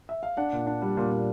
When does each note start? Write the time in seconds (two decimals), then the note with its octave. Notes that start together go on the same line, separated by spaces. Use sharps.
0.09 E5
0.23 F5
0.37 D4 F#5
0.53 A#2
0.67 D4
0.82 G3
0.97 A#2
1.12 A#2